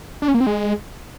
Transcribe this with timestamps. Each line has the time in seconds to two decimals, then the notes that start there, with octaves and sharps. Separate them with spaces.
0.22 D4
0.28 C#4
0.34 A#3
0.40 C4
0.47 G#3